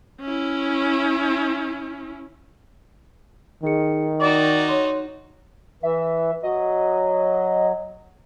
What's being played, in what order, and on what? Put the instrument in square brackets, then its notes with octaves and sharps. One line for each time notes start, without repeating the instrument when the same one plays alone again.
[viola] C#4 E4
[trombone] D#3 [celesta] D#4 G#4 C#7
[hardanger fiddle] D#4 F#4 [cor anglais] D5 [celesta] C#6 E7
[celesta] C#5 C6
[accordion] E3 [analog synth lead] E5
[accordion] F#3 [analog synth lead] D#5